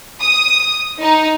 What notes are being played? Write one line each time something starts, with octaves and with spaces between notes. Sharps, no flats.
D#6
D#4